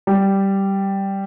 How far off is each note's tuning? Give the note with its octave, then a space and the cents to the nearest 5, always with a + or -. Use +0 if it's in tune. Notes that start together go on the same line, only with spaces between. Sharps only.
G3 -5